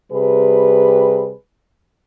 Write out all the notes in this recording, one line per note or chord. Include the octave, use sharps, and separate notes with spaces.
C3 G3 G#4 B4